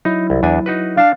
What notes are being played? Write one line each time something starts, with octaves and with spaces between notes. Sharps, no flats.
F#3 D#4 E4
C2
E2 D4 G#5
D#4 F#4 B4
D4 F5 A5